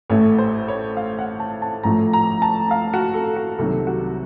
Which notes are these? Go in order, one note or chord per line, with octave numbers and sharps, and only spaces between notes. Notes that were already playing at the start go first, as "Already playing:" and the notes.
A1 A2 A3 C#5
C5
C#5
F5
F#5
A5
A5
A1 A2 F3 A3 A#5
A#5
A5
F5
F#4
A4
F#4
C2 C3 D#3 F#3 A4
F#4